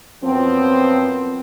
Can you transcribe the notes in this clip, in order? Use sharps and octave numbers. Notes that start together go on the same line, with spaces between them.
F#2 F3 B3 C4